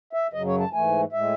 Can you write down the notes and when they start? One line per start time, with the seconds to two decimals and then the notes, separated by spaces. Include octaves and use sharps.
0.13 E5
0.33 F#2 C#3 F#3 D#5
0.46 C#5
0.60 A5
0.72 G#2 E3 A3 G#5
1.12 A2 G#3 E5